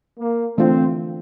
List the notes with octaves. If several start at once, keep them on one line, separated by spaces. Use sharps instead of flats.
A#3
E3 A3 C4 D4 F4